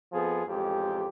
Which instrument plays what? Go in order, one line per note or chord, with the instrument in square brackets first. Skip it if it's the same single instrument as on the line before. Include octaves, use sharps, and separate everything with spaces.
[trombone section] F2 F3 B3 G#4 A4
A1 F2 G#3 G4